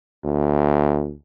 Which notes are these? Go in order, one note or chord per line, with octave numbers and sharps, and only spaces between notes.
D2